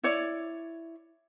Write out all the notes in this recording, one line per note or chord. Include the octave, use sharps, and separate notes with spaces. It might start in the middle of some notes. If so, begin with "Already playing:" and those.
E4 C#5 D5